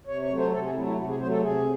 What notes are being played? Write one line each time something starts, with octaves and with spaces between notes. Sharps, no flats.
C3 C#5
C#5
F#3 A3
C5
C3 A4
G#4
F#3 A3 E4
E4
C3 F#4
G#4
F#3 A3 C5
A4
C3 G#4